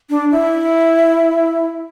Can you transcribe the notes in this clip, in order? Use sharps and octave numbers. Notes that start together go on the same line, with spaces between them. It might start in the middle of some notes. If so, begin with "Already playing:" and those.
D4
E4